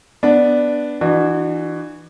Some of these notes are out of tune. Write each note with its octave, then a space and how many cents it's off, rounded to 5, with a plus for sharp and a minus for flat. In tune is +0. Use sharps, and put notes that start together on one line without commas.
B3 +0 D4 +0
E3 +0 D4 +45 F#4 +0